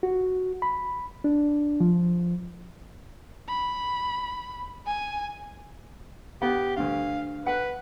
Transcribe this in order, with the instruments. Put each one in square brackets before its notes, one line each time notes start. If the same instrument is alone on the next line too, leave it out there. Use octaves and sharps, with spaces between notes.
[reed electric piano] F#4
B5
D4
F3
[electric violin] B5
G#5
[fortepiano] B3 [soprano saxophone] G4
[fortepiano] D2 G2 [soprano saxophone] F5
[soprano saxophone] B4 [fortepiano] F#5